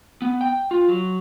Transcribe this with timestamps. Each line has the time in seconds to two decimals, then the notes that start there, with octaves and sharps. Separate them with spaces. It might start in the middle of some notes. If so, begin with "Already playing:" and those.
0.22 B3
0.41 G5
0.71 F4
0.88 F#3